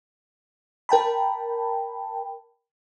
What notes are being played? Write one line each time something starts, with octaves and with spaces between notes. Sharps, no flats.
A#4 G5 A5 B5